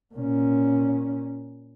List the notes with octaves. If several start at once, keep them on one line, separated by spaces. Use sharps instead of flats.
A#2 C#4